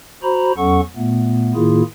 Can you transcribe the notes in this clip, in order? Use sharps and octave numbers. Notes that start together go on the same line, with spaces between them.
F#4 C5 A#5 B5
E2 F#3 C#4 A4 F#5 C#6
A#2 A3 B3
A2 D#3 A#3 E4 F4 G#4